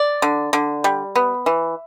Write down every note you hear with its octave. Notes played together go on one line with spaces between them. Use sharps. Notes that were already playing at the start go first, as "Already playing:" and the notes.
Already playing: D5
D3
D3
G3
B3
E3